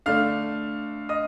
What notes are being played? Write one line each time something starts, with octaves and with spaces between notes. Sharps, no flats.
D3 A3 D4 F5 F6
D#5 D#6